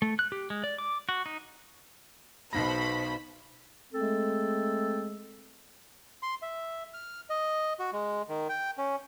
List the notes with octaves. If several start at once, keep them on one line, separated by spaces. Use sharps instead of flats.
A3
F#6
G4
G#3
D5
D6
F#4
D#4
B1 B2 C5 B5 A#6
G#3 A3 C4 G#4 A4
C6
E5
F6
D#5
F#4
G#3
D#3
G5
C#4